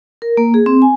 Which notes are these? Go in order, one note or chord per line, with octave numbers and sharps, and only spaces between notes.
A#4
A#3
G#4
C4
G#5